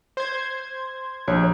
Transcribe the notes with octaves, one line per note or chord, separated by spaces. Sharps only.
C5 G#6
A#1 G4 C#5